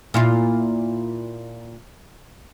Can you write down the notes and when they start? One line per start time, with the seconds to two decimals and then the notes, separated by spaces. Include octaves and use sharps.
0.14 A#2 E4 F4